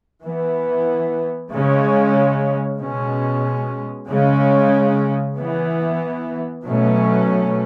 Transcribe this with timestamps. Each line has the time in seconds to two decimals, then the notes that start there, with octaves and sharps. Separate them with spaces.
0.23 E3 B3
1.52 C#3 G#3 C#4
2.80 B2 G#3 C#4
4.08 C#3 G#3 C#4
5.37 E3 B3
6.64 B2 F#3 A3 C#4